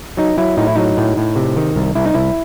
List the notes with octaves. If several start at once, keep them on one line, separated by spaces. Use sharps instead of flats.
F#3 D#4
F#3 E4
A2 D#4
E4
F#3 D#4
A2
A2
C3
D#3
C2
C2 E4
D#4
C2 E4